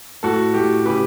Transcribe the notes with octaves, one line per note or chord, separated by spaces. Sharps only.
A2 F#4 A4
A2 G4
C#3 G4 B4